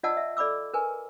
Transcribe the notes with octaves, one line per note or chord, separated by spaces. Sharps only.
F4 D5 D#5 F#5 A5 E6
E5
A4 D5 B5 D6 E6
A#4 B4 G#5